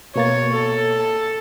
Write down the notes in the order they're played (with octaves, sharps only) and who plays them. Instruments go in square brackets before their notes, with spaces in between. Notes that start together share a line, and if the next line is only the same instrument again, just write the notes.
[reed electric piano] B2 A#3 A6 [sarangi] C#5
[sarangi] A4